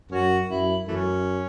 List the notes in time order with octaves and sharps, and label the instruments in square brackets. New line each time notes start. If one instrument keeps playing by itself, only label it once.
[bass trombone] F#2 [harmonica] C#4 F#4
[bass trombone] F#2 [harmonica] E4
[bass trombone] F#2 [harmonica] E3 A3 C#4